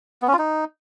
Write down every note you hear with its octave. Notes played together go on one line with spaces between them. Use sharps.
B3
C#4
F4
D#4